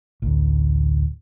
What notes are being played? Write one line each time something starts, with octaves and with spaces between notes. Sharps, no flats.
A1 D2